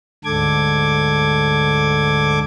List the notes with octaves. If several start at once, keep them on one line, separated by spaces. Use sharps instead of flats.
D2 G#2 D3 A4 D6 G#6